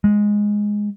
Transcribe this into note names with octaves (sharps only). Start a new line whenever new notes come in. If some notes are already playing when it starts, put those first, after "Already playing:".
G#3